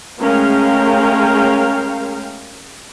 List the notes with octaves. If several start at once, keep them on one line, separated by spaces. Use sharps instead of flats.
G#3 A3 C#4 A#4 F5 G5